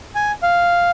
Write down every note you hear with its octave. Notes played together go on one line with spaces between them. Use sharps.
G#5
F5